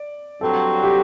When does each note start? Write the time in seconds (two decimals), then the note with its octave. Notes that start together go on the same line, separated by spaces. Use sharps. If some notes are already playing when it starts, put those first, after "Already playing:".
Already playing: D5
0.41 G2 F#3 C4 F#4 A4
0.84 G4